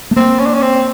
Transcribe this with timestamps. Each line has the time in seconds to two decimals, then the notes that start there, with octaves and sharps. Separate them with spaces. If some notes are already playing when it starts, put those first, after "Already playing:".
0.11 A3
0.16 A#3 C4
0.39 C#4
0.47 D4
0.54 C#4
0.62 C4